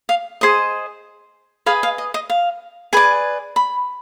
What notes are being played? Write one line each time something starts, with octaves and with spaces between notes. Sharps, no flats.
F5
G#4 C5 D#5
G#4 B4 D#5 F5
F5
D#5
D#5
F5
G#4 B4 D5 G#5
B5